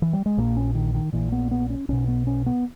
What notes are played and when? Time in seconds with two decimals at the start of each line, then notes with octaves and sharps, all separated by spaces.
0.02 E3
0.13 G3
0.26 G#3
0.37 A#1 A#2 A#3
0.56 C#4
0.75 D#3
0.94 D#3
1.13 A#1 A#2 E3
1.32 B3
1.51 B3
1.70 C#4
1.89 B1 B2 C#4
2.08 B3
2.27 C#4
2.46 B3